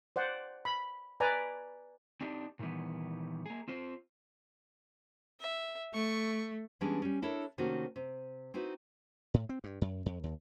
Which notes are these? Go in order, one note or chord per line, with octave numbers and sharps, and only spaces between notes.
C5 D5 F#5
B5
B4 D5 G#5 A#5
C4 D4 D#4 G4
A#2 D#3 E3 G3 B3
A#3 G#4
C4 F4 C5
E5
A3 C#6
E3 G3 G#3 B3 C#4 D4
G3 C#4
D4 E4 A4 A#4 C#5
C3 D#3 A3 A#3 C#4 F#4
C3
C4 D#4 E4 F#4 B4
A2
C4
G2
F#2
F2
D#2